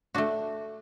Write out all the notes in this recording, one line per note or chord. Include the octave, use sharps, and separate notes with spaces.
A3 D4 F#4